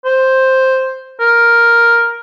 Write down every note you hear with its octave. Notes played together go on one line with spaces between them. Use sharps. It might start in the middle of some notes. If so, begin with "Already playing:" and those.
C5
A#4